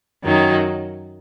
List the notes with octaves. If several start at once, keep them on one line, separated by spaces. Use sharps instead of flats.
F#2 D#3 F#3 D#4